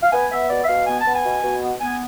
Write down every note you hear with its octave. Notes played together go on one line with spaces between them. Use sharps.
F5
B3 G#5
B3 E5
B2 D5
E5
B2 F5
B3 G#5
A5
B3
G#5
B2
B2
B3
B3 G#5